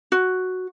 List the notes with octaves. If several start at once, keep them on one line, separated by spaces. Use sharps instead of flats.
F#4